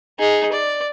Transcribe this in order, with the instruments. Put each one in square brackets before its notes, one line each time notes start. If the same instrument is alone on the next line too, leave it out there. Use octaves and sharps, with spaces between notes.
[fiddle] D#4 G#4
D5